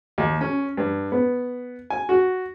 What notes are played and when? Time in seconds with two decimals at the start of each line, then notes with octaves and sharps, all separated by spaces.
0.18 D#2
0.41 C#4
0.77 G2
1.12 B3
1.90 G#5
2.09 F#4